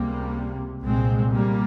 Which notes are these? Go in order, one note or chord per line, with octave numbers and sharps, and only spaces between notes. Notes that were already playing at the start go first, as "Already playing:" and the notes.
Already playing: C#2 C3 G3 A#3
C2 A#2 G#3 C4
G3 A#3